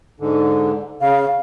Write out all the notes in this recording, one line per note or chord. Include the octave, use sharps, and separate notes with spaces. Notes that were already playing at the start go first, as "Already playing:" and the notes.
G#2 D3
C#3 F5